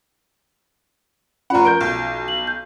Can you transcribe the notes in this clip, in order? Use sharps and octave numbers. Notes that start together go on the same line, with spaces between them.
F1 C#4 F4 D5 F#5 A#5 B5
F3 A#4 G6 D7
B1
F#7
G6